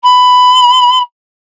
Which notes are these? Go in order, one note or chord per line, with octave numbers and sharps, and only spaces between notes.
B5